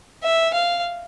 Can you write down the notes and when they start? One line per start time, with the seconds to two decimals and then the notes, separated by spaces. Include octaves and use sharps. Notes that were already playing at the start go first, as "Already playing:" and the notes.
0.23 E5
0.54 F5